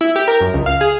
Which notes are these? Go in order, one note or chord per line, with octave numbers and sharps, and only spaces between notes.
E4
G4
A#4
F#2
C#2
F5
G#4